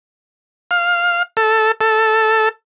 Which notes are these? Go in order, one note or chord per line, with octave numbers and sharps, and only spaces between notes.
F5
A4
A4